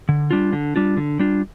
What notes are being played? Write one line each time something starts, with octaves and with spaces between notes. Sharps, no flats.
D3
G3 D4 F4
D3
G3 D4 F4
D3
G3 D4 F4